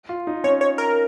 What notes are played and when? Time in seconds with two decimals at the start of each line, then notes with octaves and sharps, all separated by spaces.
0.09 F4
0.27 D#4
0.44 C#4 C#5
0.61 C#5
0.78 A#4